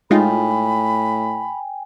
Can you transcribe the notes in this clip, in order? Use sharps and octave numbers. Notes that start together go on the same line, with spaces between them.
A2 G#3 D#4 F4 G5 G#5 B5